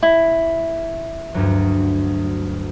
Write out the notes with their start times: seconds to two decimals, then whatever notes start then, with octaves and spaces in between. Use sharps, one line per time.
0.03 E4
1.34 D2 G2 F#3